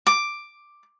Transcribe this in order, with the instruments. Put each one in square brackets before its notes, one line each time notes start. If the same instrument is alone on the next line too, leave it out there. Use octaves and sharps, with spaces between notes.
[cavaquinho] D6